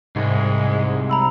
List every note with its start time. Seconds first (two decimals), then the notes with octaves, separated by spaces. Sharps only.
0.16 C2 G#2 G#3
1.10 A#5 B5 E6